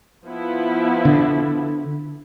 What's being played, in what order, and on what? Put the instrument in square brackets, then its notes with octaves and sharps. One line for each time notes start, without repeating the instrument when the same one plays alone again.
[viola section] F3 B3 E4
[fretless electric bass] D3